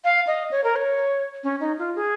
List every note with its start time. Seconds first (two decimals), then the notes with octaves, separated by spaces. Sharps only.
0.04 F5
0.27 D#5
0.51 C#5
0.64 A#4
0.76 C#5
1.44 C#4
1.60 D#4
1.78 F4
1.95 G#4